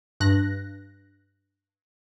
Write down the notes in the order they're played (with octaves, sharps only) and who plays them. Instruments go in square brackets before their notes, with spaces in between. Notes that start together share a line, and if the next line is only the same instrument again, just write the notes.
[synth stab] G2 F#6 A#6